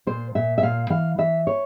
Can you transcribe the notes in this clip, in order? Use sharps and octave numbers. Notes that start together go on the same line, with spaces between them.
A#2 C5
A#2 E5
E5
A#2 F5
E3 F5
E3 E5
C#5